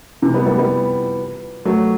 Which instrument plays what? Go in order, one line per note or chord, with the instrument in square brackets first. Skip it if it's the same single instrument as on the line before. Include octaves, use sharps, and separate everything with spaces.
[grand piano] C3 E3
G3 B3
G3 B3
G3 B3
F#3 A3